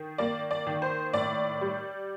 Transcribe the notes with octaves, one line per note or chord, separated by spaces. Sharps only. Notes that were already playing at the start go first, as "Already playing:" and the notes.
Already playing: D#3
A#3 D5
D5
D#3
C5
A2 D5
G3